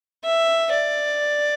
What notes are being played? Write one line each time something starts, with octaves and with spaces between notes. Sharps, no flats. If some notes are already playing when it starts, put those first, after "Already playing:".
E5
D5